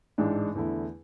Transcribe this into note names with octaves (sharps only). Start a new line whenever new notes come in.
A1 G#2 G#3 D4
E2 D3 A3 E4